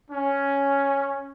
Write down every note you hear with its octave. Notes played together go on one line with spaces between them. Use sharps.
C#4